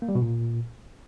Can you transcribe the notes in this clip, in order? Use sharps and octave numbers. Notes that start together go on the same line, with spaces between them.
A#3
G3
B2
A#2